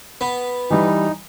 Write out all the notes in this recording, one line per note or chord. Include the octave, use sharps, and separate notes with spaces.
B3
E3 G3 D#4